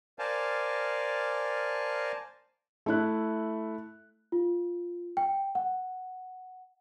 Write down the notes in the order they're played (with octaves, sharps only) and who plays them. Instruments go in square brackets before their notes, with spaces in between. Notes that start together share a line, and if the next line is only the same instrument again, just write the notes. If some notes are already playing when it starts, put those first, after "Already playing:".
[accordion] A#4 C5 D5 F5 G#5 A5
[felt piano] A3 E4 F#6
[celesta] F4
G5
F#5